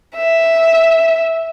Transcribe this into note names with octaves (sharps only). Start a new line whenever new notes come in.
E5